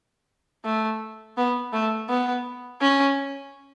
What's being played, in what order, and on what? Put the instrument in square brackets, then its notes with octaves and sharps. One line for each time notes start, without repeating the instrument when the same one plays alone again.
[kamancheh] A3
B3
A3
B3
C#4